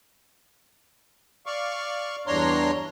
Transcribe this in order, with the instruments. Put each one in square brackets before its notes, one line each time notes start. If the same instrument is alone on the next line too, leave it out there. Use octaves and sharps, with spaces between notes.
[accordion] D5 F5 C#6
E2 G2 D4 C#5 A#5 C6